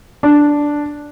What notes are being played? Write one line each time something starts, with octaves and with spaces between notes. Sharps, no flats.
D4